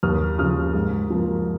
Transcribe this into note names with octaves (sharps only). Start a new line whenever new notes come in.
D#2 D#6 F6
C#3 F3 D#6 F6
G#2
F3 A#3